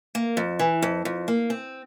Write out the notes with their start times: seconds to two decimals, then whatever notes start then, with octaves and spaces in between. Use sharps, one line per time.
0.15 A#3
0.37 F2
0.59 E3
0.82 F2
1.05 F2
1.28 A#3
1.50 C4